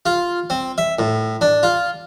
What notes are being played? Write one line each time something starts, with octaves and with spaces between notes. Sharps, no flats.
F4
C4
E5
A2
D4
F4